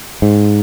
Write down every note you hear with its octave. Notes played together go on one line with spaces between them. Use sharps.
G#2